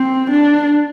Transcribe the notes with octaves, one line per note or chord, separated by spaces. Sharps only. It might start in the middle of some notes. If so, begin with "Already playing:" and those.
Already playing: C4
D4